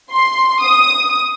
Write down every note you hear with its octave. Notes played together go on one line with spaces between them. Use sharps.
C6
D#6